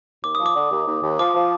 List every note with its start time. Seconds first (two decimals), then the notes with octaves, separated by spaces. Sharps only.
0.24 D#2 D6
0.35 F3 D#6
0.46 D6
0.55 D3
0.71 D#2
0.87 D#2
1.03 D#2
1.19 F3 D6
1.35 F3